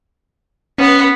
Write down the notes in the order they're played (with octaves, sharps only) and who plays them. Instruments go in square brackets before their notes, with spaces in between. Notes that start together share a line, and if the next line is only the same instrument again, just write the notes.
[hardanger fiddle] B3 B4 [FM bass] C#4